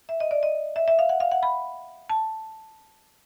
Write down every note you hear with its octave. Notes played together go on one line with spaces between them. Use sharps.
E5
D#5
D5
D#5
E5
E5
F5
F#5
F5
F#5
B5
A5